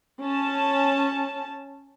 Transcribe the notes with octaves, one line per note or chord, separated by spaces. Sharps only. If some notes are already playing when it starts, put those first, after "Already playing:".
C#4 A5